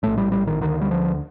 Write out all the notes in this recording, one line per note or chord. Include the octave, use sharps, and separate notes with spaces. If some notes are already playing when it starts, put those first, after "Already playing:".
A#1 A2 A3
G3
G3
D#3
D2 D3 D#3
G3
F3